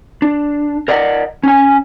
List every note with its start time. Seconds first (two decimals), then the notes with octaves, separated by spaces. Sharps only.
0.22 D4
0.88 A#4 D5 D#5 F#5
1.43 C#4 G#5